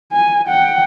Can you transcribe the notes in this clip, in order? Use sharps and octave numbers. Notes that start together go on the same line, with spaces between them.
G#5
F#5 G5